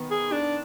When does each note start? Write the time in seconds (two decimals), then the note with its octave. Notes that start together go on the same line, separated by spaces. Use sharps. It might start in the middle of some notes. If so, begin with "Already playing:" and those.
Already playing: D#3 B3
0.11 G#4
0.32 D4